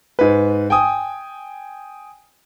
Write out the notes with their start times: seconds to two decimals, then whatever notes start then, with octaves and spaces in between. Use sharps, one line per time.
0.19 G#2 B4
0.70 G5 G#5 D#6